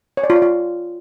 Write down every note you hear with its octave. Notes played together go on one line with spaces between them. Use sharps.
C#5
D5
F4
D5
F4